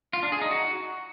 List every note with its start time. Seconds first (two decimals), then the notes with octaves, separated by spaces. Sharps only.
0.13 F4
0.23 D4
0.32 G#4
0.42 D#4
0.51 F#4